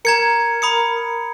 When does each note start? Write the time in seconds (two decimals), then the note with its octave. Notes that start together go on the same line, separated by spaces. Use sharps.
0.05 A#4 A#5 G#6 C#7
0.62 B5 D#6 C#7